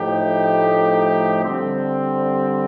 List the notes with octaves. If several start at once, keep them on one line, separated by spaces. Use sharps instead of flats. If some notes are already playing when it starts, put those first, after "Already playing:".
Already playing: A2 F3 A3 D#4 G4
D3 G3 C4